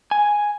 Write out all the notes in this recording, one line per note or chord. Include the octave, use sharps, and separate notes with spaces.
G#5